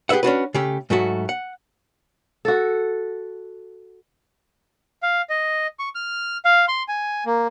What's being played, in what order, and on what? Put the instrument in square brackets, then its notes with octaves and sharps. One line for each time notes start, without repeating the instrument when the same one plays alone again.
[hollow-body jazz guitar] G4 G#4 B4 E5 F#5
C#4 D4 F#4 B4
C#3 A3 G4
G#2 F#3 A3 F#4
F#5
[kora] F#4 A4
[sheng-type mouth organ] F5
D#5
C#6
F6
F5
C6
G#5
A#3